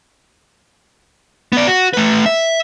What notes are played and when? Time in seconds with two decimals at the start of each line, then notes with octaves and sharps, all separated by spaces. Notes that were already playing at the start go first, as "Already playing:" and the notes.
1.53 B3 D5
1.67 F#4
1.94 A3 B4
2.26 E5